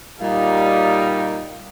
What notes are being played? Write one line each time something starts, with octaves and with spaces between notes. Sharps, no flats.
A#2 G3 D#4 F5